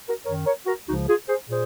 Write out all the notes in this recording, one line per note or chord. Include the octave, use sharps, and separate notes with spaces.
F#4 A#4
F#2 D#3 A#4 C#5
A#4 C#5
F#4 A#4
C#2 C#3 F3 D#4 F#4
F4 G#4
G#4 C5
A#2 G#4 C5